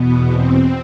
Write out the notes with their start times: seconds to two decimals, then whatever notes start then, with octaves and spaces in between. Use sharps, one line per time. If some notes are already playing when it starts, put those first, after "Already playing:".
Already playing: E2 B2 B3
0.30 C4